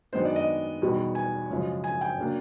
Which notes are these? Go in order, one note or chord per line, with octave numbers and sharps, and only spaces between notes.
F#2 D#3 G#3 B3 D4 C5
D5
D#5
E2 B2 G3 B3 D#4
G#5
F#2 C#3 F3 G#3
G#5
G5
C#3 F#3 A#3 D4